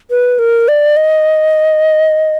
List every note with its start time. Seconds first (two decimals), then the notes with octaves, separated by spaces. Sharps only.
0.10 B4
0.39 A#4
0.68 D5
0.97 D#5